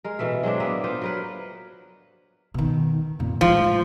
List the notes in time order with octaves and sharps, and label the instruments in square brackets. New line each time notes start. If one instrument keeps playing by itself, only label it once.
[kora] G#3 A#4
B2 E3 A3 E5
F#3 G#3 C4 D4
A#3 B3 E5
B3 F4 C5
F#3 A#4 B4
[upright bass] B2 D#3
F2 A#2
[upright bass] A2 G#3 [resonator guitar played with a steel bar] F3